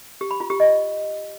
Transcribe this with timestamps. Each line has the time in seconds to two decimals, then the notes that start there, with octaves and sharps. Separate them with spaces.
0.21 G4
0.31 B5
0.40 F4
0.50 G4
0.60 D#5